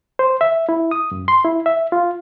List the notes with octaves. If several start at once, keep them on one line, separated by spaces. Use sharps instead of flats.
C5
E5
E4
D#6
F#2
C6
E4
E5
F4